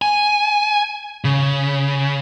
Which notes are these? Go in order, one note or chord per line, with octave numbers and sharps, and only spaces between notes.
G#5
C#3